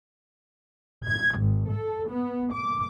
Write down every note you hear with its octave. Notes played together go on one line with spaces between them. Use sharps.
G#6
G#1
A4
B3
D6